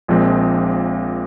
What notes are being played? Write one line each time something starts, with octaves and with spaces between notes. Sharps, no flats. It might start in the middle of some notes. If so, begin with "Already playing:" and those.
A#1 A#2 F3 G#3 C4